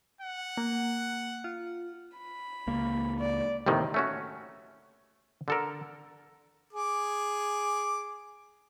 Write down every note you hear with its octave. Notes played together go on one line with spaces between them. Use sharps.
F#5
A#3
F4
B5
C#2 A#3
D5
D#2 A2 C3 D#3
A3 C#4 F#4
D3 A4 A#4
G#4 D6